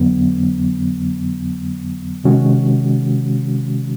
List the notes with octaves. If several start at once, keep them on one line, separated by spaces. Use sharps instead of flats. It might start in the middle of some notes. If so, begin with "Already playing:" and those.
Already playing: F2 D3 F#3 B3
C3 D#3 G#3 C#4 F#4